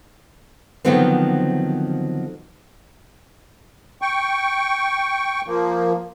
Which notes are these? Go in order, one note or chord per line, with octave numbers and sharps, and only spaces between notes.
D3 D#3 F3 F#3 B3 C4
G5 C#6
F3 A#3